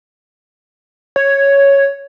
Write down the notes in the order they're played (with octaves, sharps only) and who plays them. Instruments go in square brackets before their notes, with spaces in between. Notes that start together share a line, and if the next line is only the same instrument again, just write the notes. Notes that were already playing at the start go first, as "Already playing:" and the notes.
[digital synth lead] C#5